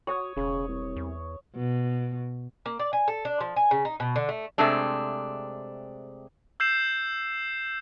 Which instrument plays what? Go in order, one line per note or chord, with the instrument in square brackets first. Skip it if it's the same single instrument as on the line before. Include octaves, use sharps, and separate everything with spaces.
[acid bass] F#4 [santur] C#5 D#6
[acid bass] E1 [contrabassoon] C#3
[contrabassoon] C2
[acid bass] E2
[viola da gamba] B2
[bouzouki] A#3
D5
G#5
A4
D4
F3
G#5
C#3
D#4
B2
D3
A3
[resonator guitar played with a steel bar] C3 G#3 A3 C4 D4
[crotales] E6 G6 C7 E7